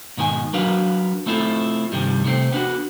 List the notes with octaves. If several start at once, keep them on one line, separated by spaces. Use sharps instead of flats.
G#2 B2 D#3 B4 G#5
F#3 D4 F#4 A#4 B4 F5
A3 C4 E4 F4 A4
G2 C3 D#3 G3
C3 A3 C4
B3 D4 D#4 F#4